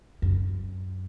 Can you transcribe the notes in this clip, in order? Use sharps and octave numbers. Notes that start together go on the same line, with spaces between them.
F#2